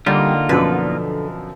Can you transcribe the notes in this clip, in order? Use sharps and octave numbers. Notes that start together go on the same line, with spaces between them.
D3 G3 A#3 D#4 F4
F#2 B2 D3 F3 B4